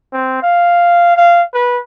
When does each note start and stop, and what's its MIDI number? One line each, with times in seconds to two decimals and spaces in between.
0.13 0.40 60
0.42 1.16 77
1.17 1.42 77
1.54 1.78 71